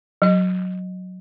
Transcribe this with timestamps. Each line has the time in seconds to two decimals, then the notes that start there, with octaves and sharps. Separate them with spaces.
0.22 F#3 D#5